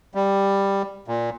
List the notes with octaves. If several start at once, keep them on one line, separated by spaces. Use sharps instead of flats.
G3
A#2